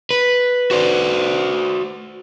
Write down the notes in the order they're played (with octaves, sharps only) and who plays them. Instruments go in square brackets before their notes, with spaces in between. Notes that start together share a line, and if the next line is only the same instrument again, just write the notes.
[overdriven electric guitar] B4
[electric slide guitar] F#4 C5 D5